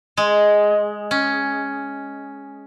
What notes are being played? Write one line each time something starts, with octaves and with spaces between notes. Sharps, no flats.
G#3
C#4